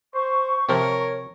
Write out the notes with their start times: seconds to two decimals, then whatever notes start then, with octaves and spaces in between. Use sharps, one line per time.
0.14 C5 C#6
0.69 C3 F3 A#4 C#5